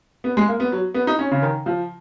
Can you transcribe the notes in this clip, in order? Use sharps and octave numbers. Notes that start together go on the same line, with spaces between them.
B3
G#3
A#3
B3
F#3
B3
D#4
C#4
C#3
D#3
F3